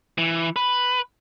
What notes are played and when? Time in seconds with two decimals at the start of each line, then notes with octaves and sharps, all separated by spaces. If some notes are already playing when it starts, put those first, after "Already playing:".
0.18 E3
0.56 B4